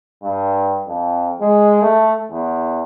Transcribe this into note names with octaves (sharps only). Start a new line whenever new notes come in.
G2
F2
G#3
A3
E2